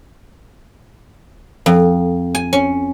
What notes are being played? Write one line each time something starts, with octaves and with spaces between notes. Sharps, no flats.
F2
G#5
C#4